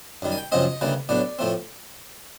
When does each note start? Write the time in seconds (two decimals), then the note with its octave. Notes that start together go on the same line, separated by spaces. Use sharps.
0.22 F#2 D#3 G3
0.32 G#5
0.38 G5
0.52 F#2 C#3 F3 G#3 C4 D#5
0.81 D2 C#3 E3 G3 A#3
1.09 A2 F#3 B3 D4 D5
1.39 A2 F3 A3 C4